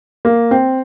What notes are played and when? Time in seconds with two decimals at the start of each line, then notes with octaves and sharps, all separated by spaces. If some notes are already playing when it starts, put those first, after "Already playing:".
0.25 A#3
0.51 C4